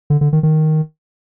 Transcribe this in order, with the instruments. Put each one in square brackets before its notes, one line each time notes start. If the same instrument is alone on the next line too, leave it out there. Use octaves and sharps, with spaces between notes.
[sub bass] D3
D3
D#3
D#3